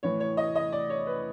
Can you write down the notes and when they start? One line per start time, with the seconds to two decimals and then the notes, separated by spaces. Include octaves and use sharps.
0.03 A2 E3 C#5
0.20 C#5
0.37 D#5
0.56 D#5
0.72 D5
0.90 C#5
1.07 B4